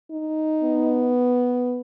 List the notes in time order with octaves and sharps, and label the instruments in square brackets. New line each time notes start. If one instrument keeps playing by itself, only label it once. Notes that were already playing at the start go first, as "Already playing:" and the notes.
[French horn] D#4
[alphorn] B3